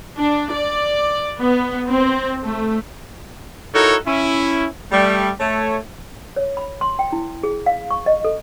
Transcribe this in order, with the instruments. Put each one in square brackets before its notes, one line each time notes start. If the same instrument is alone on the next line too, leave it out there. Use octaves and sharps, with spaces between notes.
[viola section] D4
D5
B3
C4
A3
[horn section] D#4 E4 F#4 A4 A#4 C#5
C#4 E4
G3 A3
A3 C#5
[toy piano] C#5
B5
C6
G5
E4
G#4
F5
C#6
D#5
A4